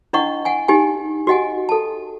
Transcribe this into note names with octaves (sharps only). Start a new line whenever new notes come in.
D4 E4 D#5 F#5 C#6
F#5 G#5
D#4 G4 G#5
F#4 G4 D#5 F#5 G#5
A4 A5